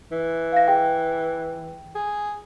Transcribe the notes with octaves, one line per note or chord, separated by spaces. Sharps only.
E3
F5 A#6
G#4 G5
G#4